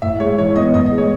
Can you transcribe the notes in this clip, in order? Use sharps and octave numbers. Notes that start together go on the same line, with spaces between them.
A2 E5
G#3 C#5
E3 C#5
B3 D#5
A2 D#5
D#5
G#3
C#5